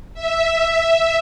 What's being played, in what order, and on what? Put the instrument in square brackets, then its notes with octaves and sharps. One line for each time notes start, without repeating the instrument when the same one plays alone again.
[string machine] E5